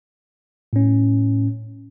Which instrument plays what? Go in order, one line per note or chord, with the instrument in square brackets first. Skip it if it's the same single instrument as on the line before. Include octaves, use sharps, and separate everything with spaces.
[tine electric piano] A2 C#4